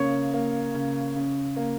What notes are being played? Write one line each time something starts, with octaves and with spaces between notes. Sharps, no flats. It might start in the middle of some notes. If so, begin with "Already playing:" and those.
Already playing: C#3 A#3 C#5 C#6
A#3
C#3
C#3
A#3